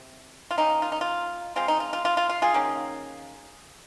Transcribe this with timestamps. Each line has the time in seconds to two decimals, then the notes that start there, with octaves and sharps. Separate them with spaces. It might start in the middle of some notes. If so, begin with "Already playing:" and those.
Already playing: C3
0.51 F4
0.57 D#3 A#3 C#4 D#4
0.82 F4
0.92 D#4
1.01 F4
1.56 F3 G#3 C4 F4
1.68 D#4
1.80 F4
1.93 F4
2.05 F4
2.17 F4
2.29 F4
2.42 F4 G#4
2.54 D#3 A#3 C#4